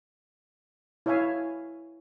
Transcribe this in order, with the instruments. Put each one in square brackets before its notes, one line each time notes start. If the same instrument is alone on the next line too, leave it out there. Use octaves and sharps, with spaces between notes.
[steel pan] E4 C#5 E5 F5 G#5